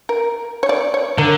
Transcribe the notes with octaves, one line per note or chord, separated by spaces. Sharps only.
A#4
C#5
D5
C#5
D3 A#4